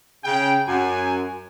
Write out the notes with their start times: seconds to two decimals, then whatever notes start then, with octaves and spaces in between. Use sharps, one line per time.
0.25 C#3 G5
0.68 F#2 G#5